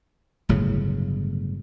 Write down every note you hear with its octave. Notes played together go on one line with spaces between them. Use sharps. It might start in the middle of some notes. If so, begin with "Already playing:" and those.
G1 A2 C#3 F#3